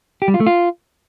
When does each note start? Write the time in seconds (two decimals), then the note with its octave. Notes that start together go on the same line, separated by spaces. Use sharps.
0.22 G4
0.28 G3
0.34 F4
0.40 A3
0.47 F4